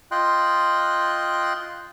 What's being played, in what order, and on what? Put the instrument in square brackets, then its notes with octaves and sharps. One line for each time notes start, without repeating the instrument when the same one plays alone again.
[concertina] F4 D#5 G5 C6 F#6